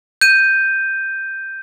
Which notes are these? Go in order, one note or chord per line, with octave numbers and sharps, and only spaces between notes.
G6 D#7